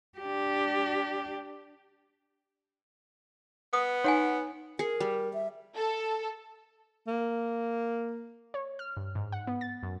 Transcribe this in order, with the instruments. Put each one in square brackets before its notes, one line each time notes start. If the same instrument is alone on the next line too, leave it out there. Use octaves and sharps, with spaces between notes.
[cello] D4 G4
[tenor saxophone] B3 [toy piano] D#6
[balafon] D#4 [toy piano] C#5 F#5 G#5
[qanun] G#4 [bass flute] A#4
[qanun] G3
[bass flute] E5
[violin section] A4
[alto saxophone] A#3
[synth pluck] C#5
F6
G2
G#2
F#5
B3
A6
F#2